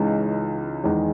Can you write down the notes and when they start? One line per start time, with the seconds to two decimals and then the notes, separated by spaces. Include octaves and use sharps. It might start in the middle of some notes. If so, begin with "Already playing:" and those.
Already playing: C#2 C#3 E3 G#3 D#4
0.84 E2 D#3 G#3